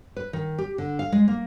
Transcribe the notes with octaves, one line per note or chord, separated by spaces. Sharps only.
B4
D#3
G4
D3
F5
G#3
A#3